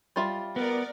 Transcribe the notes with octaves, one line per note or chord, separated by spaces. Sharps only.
G3 F4 E5
B3 A#4 D5